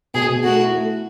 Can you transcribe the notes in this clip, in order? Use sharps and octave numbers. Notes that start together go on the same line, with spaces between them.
B2 G#4
B2
A3 F#4
E4
A3